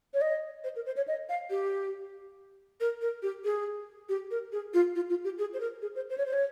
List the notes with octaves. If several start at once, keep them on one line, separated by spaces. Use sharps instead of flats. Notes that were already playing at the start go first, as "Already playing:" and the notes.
C#5
D#5
C5
A#4
C5
C#5
D#5
F5
G4
A#4
A#4
G4
G#4
G4
A#4
G#4
F4
F4
F4
G4
G#4
C5
A#4
G#4
C5
C5
C#5
C5
C#5